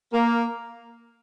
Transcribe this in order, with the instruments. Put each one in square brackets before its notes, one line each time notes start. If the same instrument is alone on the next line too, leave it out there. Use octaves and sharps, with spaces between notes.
[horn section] A#3